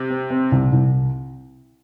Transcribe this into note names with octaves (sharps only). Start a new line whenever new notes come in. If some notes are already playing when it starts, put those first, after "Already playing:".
Already playing: C3
C4
C4
C2
C2